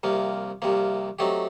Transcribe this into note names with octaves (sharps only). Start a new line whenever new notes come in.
C2 C3 F3 A#3
C2 C3 F3 A#3
F#3 A3 C4 D#4 G4